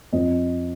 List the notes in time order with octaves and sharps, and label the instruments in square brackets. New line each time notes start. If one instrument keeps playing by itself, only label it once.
[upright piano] F2 F3 C4 D#5